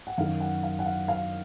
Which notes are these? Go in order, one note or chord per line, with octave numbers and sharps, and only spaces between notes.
F#5
F#2 D#3 F5
F#5
F5
F#5
F5
F5